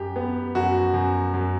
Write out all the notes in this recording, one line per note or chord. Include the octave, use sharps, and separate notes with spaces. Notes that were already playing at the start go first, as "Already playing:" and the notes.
Already playing: F#2 G4
B3
F#2 F#4
F#2
F#2